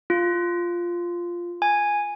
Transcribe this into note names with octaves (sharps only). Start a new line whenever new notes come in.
F4
G#5